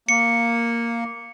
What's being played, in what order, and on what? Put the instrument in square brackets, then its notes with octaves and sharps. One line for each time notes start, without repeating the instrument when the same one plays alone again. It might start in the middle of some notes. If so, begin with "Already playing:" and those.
[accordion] A#3 [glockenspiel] C#7